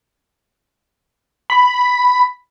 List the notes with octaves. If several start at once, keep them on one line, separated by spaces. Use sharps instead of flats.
B5